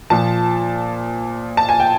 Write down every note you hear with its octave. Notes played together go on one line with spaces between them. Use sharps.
A#2 F3 A5
A5
G#5
G5